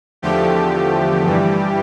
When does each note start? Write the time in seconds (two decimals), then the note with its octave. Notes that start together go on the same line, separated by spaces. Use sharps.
0.22 E2 D3 F3 A3 G4
1.24 G2 E3 G3